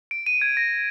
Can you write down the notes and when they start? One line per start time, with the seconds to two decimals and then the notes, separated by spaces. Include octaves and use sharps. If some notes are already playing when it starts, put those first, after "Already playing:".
0.11 D7
0.26 D#7
0.42 G#6
0.57 A#6